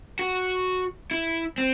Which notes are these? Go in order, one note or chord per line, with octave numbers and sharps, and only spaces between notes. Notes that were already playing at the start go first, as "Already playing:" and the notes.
F#4
E4
C4